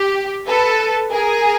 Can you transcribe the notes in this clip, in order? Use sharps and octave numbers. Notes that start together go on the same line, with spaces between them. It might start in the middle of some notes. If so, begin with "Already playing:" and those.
Already playing: G4
A4 B4
G#4 A#4